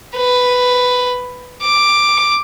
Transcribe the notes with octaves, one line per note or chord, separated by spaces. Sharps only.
B4
D6